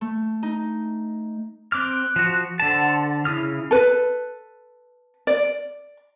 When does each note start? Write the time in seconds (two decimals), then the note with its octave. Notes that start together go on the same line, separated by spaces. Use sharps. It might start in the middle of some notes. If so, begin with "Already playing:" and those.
0.01 A3
0.43 D#4
1.72 C4 D6 F6 F#6
2.16 F3 F#4
2.60 D3 A4 C5 F#5 A5
3.25 C#3 E4 D#6 F6
3.71 A4 B4
5.27 D5